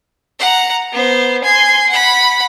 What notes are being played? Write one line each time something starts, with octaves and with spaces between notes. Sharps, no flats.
F#5 A#5
B3 C5
G#5 C6
F#5 B5